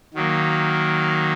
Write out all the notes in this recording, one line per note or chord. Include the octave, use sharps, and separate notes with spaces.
D#3 F#3 A#3